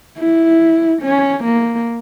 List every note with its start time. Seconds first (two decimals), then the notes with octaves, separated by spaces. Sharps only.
0.18 E4
1.02 C#4
1.44 A#3